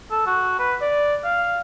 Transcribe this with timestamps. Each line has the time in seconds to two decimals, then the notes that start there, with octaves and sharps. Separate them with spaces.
0.11 A4
0.26 F#4
0.59 B4
0.81 D5
1.24 F5